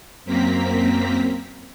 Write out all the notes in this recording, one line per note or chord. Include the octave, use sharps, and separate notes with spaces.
F#2 A#3 C4 A#5 B6